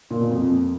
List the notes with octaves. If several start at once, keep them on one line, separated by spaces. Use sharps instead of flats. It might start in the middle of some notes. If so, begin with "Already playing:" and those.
A#2
B2
F2